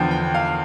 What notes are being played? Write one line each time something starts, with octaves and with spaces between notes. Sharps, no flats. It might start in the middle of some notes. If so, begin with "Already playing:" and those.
Already playing: E2 D3 F3 G5
G5
F5